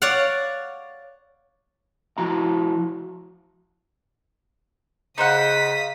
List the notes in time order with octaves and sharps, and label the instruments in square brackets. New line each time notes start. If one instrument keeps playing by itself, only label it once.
[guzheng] C#5 D5 F5 F#5
[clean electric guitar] F3 E4 F#4 A#5
[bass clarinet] C#3 [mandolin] D#4 C5 F#5 [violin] D#6 B6